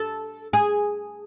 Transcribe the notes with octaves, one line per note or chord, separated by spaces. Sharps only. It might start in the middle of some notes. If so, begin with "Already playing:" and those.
Already playing: A4
G#4